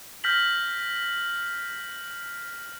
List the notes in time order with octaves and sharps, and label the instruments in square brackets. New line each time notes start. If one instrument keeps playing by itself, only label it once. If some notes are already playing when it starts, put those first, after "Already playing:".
[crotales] F6 G6 A#6 B6 F#7